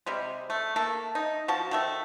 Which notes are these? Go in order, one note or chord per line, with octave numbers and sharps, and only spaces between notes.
C3 G3 G#3
A3
A3 A#3 A4
D#4
F3 F#4 A5
D#3 A3 E5